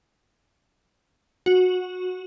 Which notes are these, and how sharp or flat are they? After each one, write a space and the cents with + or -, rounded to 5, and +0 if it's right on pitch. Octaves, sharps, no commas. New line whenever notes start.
F#4 -15